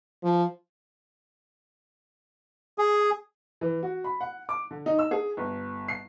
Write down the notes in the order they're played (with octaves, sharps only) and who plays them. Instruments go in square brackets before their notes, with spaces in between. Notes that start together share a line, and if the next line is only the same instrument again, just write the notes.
[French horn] F3
[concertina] G#4
[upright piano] E3
F#4
B5
F#5
D6
D3
D#4
E6
G#4
G1
C7